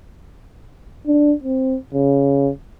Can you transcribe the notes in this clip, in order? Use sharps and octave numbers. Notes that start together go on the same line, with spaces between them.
D4
C4
C#3